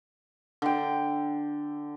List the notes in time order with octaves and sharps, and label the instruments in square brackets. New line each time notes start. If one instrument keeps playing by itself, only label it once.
[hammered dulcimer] D3 G5